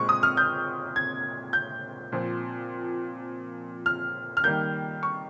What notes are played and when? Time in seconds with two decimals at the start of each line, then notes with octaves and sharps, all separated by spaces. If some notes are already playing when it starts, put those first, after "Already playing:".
Already playing: A#2 G#3 C4 C#6
0.09 D#6
0.23 F6
0.37 G6
0.96 G#6
1.53 G6
2.12 A#2 F3 C4
3.86 F6
4.37 F6
4.44 D#3 G3 A#3 G6
5.03 C#6